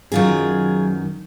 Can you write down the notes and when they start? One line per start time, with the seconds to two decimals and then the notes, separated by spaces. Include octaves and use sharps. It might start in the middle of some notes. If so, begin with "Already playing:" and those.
0.12 F#2 D#3 F#3 F4 G#4